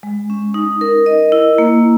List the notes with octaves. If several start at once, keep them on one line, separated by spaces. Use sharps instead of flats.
G#3
C#4
D#4
A#4
D#5
E4
A#3